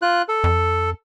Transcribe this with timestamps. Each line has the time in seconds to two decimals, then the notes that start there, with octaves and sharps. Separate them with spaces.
0.02 F4 F#6
0.29 A4
0.44 F2